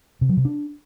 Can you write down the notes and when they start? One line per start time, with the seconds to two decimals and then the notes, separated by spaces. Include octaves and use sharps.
0.21 C3
0.29 F#3
0.37 C3
0.45 D4